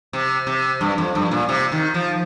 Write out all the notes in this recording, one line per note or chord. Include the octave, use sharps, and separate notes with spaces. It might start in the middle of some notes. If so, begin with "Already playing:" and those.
C3
C3
G2
F2
G2
A#2
C3
D#3
F3